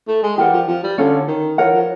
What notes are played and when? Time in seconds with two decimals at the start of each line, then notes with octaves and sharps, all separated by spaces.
0.08 A3
0.23 G#3
0.37 E3 G4 A#4 D5 F#5
0.53 F3
0.68 F3
0.83 G3
0.98 D3 C#4 F4 A4 C#5
1.28 D#3
1.58 E3 F4 A#4 C#5 F#5
1.74 F3